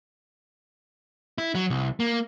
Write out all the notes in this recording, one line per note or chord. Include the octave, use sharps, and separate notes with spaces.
E4
F#3
C2
A#3